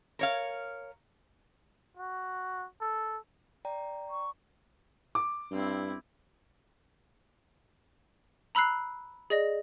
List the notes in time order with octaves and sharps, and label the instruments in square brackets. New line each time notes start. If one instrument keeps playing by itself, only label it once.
[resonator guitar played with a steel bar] A#4 C#5 F5
[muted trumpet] F#4
A4
[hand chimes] D5 G5 A#5
[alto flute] C#6
[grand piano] D6
[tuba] G2 [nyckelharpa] C4 E4
[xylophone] A#5 B5 E6 F#6 C7
G#4 D5 D#5 A#6